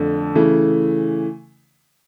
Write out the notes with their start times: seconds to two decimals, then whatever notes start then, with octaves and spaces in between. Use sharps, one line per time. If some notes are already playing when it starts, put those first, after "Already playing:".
Already playing: F2 D3 A3
0.35 C#3 E3 A3